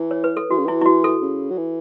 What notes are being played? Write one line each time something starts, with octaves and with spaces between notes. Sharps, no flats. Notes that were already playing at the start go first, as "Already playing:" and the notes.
Already playing: E3 E4
C#5
B4
A4
E3 F#4
C#3
E3 E4
E4
F#4
A4
C#3
F#3
E3